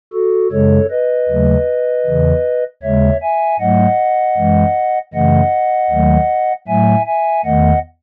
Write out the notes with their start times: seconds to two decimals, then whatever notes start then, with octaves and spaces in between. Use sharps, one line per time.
0.13 F#4 A4
0.51 F#2 C#3 G#3 A4 C#5
0.90 B4 D#5
1.29 D#2 C#3 F#3 A3
2.06 E2 C#3 E3
2.82 D#2 C#3 G#3 C#5 E5
3.21 E5 G#5
3.60 G#2 F#3 A3 D#5 F#5
4.37 F#2 E3 G#3
5.14 F#2 C#3 E3 A3 D#5 F#5
5.90 D#2 D#3 F#3 A3
6.68 A2 F#3 A3 E5 G#5
7.06 E5 G#5
7.45 E2 D#3 A3 D#5 F#5